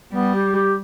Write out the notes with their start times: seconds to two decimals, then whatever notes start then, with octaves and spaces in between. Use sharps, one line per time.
0.12 G3 B3
0.34 G4
0.55 G4